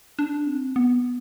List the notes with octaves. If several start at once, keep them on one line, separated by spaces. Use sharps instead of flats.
D4
C4
B3